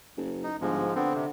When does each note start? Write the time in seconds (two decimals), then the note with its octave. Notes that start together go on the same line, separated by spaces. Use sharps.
0.17 F#1
0.44 D#4
0.61 G1 G#2 F3 G#3
0.96 D3 B3 C4
1.15 C3